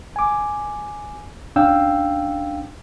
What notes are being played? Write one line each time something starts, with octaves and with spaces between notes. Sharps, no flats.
G#5 D6
C#2 C#4 D4 F5 G5 E6